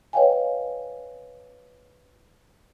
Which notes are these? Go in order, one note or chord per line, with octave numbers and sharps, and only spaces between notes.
B4 C#5 D#5 F5 G5 G#5